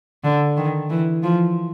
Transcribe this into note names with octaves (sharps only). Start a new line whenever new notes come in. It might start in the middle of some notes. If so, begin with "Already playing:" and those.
D3
D#3
E3
F3